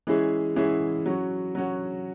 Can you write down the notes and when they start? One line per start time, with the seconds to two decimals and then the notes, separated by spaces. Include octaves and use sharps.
0.07 E3 G#3 C#4 E4 G#4
0.56 E3 G#3 C#4 E4 G#4
1.06 F#3 C#4 F#4
1.55 F#3 C#4 F#4